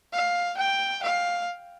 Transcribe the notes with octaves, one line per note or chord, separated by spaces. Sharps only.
F5
G5
F5